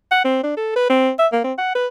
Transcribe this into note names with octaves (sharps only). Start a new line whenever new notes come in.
F#5
C4
D4
A4
B4
C4
E5
A#3
C4
F#5
B4